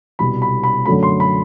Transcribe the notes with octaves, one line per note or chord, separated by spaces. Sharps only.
C2 B2 G3 B5
B5
B5
F#2 D3 F#3 A3 B5
C6
B5